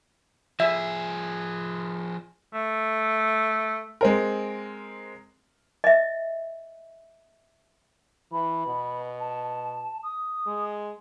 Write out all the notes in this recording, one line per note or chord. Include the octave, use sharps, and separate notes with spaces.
F3 G#4 E5
A3
G#3 C4 A#4
D#5 E5
E3 B5
B2
A5
D#6
G#3